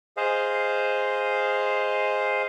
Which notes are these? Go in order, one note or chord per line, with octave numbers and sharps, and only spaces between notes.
G#4 C5 D#5 F5